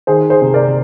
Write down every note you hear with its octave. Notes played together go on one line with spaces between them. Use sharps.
D#3 G#4 C5
G#4 C5
C3
A#4 D5